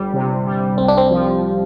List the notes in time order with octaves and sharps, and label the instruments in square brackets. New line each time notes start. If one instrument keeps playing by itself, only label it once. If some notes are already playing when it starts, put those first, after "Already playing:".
Already playing: [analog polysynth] G1 G3
C3
G3
[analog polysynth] C2 [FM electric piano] C4
[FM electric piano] D4
C4
[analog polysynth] F3